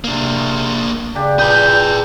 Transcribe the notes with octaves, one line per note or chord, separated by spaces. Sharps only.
C3 A#3 D4
C#3 D4 G4
A#2 G#4 B4 G6